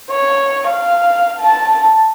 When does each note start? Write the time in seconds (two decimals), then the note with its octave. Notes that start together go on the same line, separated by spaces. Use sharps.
0.10 C#5
0.67 F5
1.39 A5